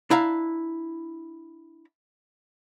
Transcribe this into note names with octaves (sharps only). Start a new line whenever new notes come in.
D4 E4 F5 A#5